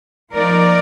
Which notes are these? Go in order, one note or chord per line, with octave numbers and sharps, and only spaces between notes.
F3 A#3 D#4 A#4 D5